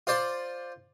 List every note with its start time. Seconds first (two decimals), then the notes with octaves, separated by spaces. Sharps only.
0.07 F4 C5 D5